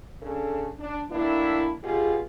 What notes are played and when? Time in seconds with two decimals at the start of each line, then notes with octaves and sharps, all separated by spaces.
0.22 C#3 D4 A4
0.79 D4
1.10 A2 A#3 D4 E4
1.83 B2 F4 G4 G#4